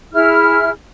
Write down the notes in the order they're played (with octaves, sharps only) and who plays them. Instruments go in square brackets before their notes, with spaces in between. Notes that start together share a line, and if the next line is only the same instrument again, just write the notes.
[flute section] E4 G#4 F6